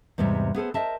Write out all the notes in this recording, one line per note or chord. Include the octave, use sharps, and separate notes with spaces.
E2 G#2 C3 G3 E5
B3 G#4 A4 C5
A#4 C5 D#5 E5 A5